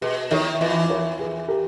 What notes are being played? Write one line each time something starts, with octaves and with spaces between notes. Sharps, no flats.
B2 G#4 B4
D#2 D#3 A#4 C#5
E2 E3 B4 D#5
A#4 C#5
G#4 B4
G4 A#4